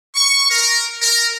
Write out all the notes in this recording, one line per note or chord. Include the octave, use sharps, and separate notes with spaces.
C#6
A#4
A#4